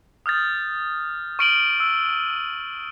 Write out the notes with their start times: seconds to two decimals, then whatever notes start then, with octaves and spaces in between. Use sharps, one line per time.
0.26 D#6 F6 G6 A6
1.39 C#6 F6 D7 D#7 F#7 G7
1.80 E6